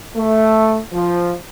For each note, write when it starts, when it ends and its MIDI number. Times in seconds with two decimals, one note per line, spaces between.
0.16 0.78 57
0.93 1.32 53